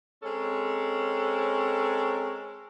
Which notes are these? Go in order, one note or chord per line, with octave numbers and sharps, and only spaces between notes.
G#3 C4 C#4 A4 A#4